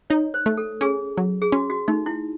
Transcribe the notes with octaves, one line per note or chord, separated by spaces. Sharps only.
D#4 C#5
C5
A3
A4
C#4 G#4
F#3
G#4
C#4 F#4
F#4
A3 D#4
E4